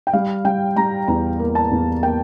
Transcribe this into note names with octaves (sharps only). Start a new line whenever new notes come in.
G5
G3 F5
G3 G5
G3 A#5
E2 A#5
A#3
A5
E2
A#3 G5